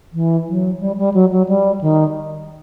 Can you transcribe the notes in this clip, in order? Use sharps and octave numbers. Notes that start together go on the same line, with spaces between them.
E3
F#3
G3
G3
F#3
F#3
G3
D#3